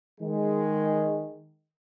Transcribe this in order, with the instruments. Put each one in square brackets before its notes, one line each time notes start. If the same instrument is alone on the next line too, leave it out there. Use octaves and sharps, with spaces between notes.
[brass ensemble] D#3 G#3